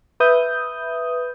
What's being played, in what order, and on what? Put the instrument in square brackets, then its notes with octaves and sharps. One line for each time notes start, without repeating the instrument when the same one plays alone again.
[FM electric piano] B4 E5 D#6 G6